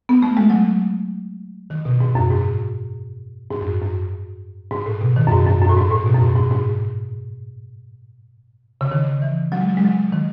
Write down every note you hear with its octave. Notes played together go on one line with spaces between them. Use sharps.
B3
A3
G#3
F#3
D#3
B2
G#2
F#2
G#2
G#2
F#2
F#2
G#2
A2
B2
D#3
F#2
G#2
F#2
F#2
A2
G#2
A2
B2
F#2
G#2
G#2
G#2
C#3
D#3
E3
F#3
G#3
F#3
G#3
F#3
D#3